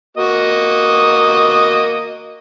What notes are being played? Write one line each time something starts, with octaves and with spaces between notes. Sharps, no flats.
A#3 F#4 D#5